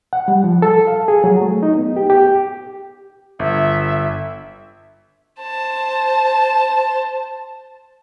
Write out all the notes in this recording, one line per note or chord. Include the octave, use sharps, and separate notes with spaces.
F#5
G3
F3
A4
F5
G#4
F#3
A3
D#4
B3
G4
G4
G1 E5
C5 A5